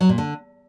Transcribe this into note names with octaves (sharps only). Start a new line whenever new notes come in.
F#3
A#2
D3